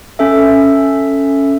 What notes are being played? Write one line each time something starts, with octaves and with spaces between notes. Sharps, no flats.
C#4 A4 E5